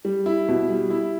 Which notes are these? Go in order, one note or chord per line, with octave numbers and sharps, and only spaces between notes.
G3
E4
B2
G3
E4